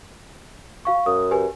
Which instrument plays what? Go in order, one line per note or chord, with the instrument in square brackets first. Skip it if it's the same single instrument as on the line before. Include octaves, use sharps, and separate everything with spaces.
[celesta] F#4 F5 C#6
[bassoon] F#2 [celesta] D#6
[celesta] G4 B4 G#5